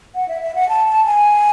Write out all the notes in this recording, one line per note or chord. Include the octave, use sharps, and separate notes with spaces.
F#5
E5
E5
F#5
A5
A5
G#5